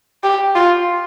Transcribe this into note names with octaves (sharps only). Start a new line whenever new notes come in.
G4
F4